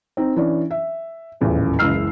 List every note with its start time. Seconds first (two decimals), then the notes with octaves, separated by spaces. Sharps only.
0.17 C4 D#4
0.36 E3 C#4 D4
0.71 E5
1.41 D#1 A1 E2 F3
1.79 F#1 C#2 E3 E6 F6 C7